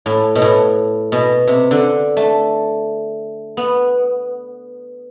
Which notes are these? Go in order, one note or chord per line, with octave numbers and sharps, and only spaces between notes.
A2
B2
A2
B2
C3
D3
A3
B3